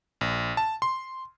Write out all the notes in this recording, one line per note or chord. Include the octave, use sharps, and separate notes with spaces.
A#1
A5
C6